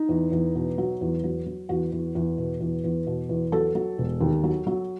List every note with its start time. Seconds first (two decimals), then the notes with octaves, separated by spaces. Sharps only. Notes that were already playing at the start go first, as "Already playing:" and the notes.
Already playing: D#4
0.09 E2
0.32 E2
0.55 B2
0.78 F#3
1.01 E2
1.24 F#3
1.46 F#3
1.69 E2 F#4
1.92 E2
2.15 E2
2.38 B2
2.61 E2
2.84 E2
3.07 B2
3.29 E2
3.52 F#3 A4
3.75 F#3
3.98 E1
4.21 D#2
4.44 F#3
4.67 F#3